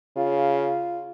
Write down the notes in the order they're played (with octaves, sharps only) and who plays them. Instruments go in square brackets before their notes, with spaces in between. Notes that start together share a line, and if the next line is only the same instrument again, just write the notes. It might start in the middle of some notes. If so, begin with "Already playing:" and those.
[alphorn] C#3 [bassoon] F4